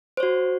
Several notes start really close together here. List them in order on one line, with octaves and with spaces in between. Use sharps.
C5 C#5 F#4